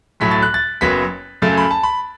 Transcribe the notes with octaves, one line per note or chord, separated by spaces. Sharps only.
B1 A2 F#3 A3 B6
A6
F#6
A6
F#1 F#2 F#3 B3 B6
F#2 C#3 A3 A6
B5
A5
B5